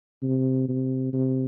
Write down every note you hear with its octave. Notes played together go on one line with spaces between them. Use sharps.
C3
C3
C3